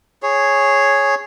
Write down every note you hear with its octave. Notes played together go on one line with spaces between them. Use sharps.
G#4 C#5